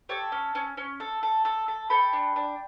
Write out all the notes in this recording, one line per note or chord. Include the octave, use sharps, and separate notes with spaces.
G4 A4 C#5
C#4
C#4
C#4
A4
A4
A4
A4
A4 G5 B5
D4
D4